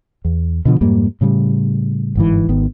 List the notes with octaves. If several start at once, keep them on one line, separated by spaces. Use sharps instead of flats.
E2
B2 D3 F3
F2 G#2 G3 A#3
A2 C#3 G3
G1 G#2 E3
G#1 D#3 B3